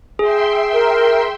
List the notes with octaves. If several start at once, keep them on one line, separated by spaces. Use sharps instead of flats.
G#4 E5 G5 C6
A#4